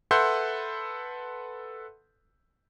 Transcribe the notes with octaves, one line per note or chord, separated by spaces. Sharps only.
A4 B4 E5 F#5 C6 G6